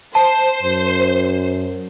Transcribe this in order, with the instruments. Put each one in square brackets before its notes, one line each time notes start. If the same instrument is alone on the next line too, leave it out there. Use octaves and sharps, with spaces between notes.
[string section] C5 [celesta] A5
[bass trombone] F#2